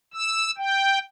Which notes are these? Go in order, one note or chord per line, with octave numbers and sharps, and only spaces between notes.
E6
G5